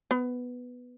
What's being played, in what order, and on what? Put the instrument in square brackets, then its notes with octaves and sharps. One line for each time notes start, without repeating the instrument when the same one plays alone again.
[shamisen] B3